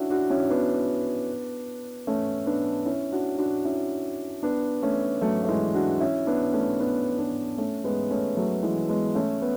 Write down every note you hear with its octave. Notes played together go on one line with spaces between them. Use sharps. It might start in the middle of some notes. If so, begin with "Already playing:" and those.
Already playing: C#4 D4 E4 F#4
D4 F#4
C#4 E4
B3 D4
A3 C#4
B3 D4
C#4 E4
D4 F#4
D4 F#4
C#4 E4
B3 D4
A3 C#4
F#3 A3
A3
E3 G#3
D4 F#4
C#4 E4
B3 D4
A3 C#4
B3 D4
B3 D4
A3 C#4
G#3 B3
A3 C#4
F#3 A3
E3 G#3
G#3 B3
A3 C#4
B3